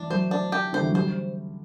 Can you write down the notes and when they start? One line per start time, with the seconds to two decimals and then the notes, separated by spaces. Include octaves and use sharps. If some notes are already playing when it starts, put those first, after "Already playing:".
Already playing: E3 D4
0.10 F#3 C5
0.31 D4
0.52 G4
0.73 D3 C5
0.81 E3
0.87 F#3
0.95 G3 C5